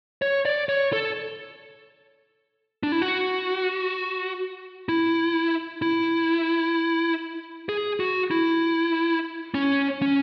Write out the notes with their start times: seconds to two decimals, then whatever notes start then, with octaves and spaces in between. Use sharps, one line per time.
0.22 C#5
0.45 D5
0.69 C#5
0.93 A4
2.83 D4
2.92 E4
3.02 F#4
4.89 E4
5.82 E4
7.69 G#4
8.00 F#4
8.31 E4
9.54 C#4
10.02 C#4